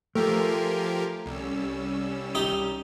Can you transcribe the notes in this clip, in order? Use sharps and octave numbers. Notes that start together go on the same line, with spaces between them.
F3 A3 G4 A#4 G#5 C6
C2 G3 C#4 E6
D#4 G4 D6